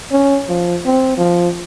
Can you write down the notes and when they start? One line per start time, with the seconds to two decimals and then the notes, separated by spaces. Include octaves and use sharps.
0.12 C#4
0.49 F3
0.85 C4
1.17 F3